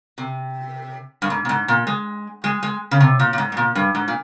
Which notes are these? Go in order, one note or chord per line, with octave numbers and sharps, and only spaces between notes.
C3
G2
G#2
A#2
G#2
A#2
G#3
G#3
G#3
C#3
C3
A#2
A#2
G#2
G#2
A#2
G2
G#2
A#2